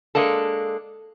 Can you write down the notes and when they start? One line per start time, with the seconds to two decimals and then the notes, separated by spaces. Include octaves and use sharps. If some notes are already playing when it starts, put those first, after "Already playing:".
0.15 G#3 A#3 D4 A4